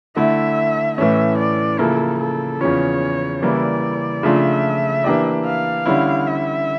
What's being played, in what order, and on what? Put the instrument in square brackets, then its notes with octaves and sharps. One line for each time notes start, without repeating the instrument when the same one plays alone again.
[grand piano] D3 A3 E4 [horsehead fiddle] E5
[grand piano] A2 E3 A3 C#4 [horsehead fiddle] E5
[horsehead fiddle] D5
[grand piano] C#3 F3 A#3 E4 [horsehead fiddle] A4
[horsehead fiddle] A4
[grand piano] E2 C#3 F3 C#4 [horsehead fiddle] C#5
[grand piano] C#3 E3 G3 A#3 E4 [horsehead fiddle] D5
[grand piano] C#3 F3 A3 D4 F4 [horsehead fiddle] E5
[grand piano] E3 A#3 D4 G4 D5
[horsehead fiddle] F5
[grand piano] D3 G3 C#4 E4
[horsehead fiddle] E5